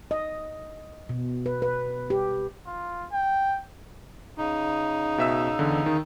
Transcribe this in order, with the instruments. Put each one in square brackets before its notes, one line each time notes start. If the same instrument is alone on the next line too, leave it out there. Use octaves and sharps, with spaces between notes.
[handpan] D#5
B2
B4
B4
G4
[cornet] F4
G5
[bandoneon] C#3 D#4
[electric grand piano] B2 E5 E6
E2 D3
D#3